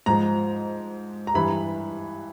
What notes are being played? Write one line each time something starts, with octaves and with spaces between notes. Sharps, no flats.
G#2 F3 A#5
A#5
G2 E3 B5